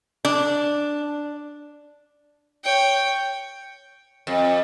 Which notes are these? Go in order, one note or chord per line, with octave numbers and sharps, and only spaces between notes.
D4
C#5 G5
F2